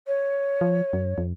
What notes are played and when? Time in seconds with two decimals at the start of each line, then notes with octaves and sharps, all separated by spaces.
0.07 C#5
0.61 F3
0.93 F#2
1.18 F2